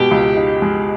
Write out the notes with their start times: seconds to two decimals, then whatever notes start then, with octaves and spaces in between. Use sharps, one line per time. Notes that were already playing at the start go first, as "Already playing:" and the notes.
Already playing: B2 G#3 G4
0.11 C#2
0.36 D#4
0.62 G#3